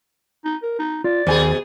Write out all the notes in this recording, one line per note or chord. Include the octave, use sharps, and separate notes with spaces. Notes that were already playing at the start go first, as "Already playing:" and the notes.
D#4
A#4
D#4
F4 D5
D#2 B2 G#4 G#5